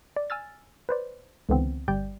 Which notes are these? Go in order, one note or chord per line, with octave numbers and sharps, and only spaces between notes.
D5
G#5 E6 F6 A6
B4 C5 D5
C#2 D3 E3 B3 C4
G1 G3 D5 G5 G6